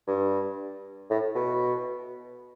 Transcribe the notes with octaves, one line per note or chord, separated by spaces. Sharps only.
G2
A2
B2